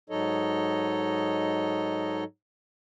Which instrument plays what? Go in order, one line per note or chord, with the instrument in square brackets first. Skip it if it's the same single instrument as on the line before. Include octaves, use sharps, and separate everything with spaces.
[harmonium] G#2 F#3 D#4 A4 C#5 D#5